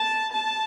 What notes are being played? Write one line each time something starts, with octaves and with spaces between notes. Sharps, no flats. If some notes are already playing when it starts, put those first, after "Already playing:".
Already playing: A5
A5